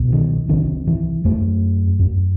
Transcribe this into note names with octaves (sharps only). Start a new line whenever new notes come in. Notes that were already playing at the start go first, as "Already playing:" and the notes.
Already playing: C2 B2
D#3
C2 C3 D#3
E3
F#2 A3
F#2